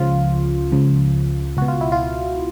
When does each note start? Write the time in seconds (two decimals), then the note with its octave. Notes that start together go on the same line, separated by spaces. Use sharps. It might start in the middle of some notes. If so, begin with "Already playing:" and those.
Already playing: C#2 C#3 F3 F4
0.72 C#2 C#3 F3
1.57 C#2 B2 F#4
1.68 F4
1.81 E4
1.92 F4